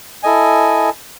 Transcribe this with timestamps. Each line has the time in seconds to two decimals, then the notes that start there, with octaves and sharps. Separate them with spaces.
0.23 E4 A4 D#5 G#5